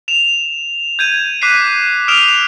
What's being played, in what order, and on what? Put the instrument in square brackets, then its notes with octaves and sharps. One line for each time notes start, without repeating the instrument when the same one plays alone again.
[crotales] E7 F7
G6 G#6 D#7 E7
D6 F#6 B6 C7 D#7
D#6 F6 D7 E7 F7